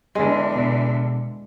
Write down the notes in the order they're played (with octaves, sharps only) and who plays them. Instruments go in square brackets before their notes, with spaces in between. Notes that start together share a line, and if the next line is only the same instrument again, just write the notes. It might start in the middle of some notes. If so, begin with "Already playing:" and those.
[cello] E2 D3 [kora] G#3
[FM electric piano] B2